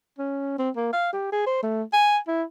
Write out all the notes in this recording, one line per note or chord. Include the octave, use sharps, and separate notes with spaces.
C#4
C4
A#3
F5
G4
G#4
C5
A3
G#5
E4